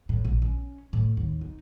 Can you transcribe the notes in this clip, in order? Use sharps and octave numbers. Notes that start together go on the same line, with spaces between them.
A2
A#1
C#4
A2
D#2
D#4